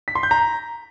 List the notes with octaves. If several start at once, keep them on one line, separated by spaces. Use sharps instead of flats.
B6
C6
G6
A#5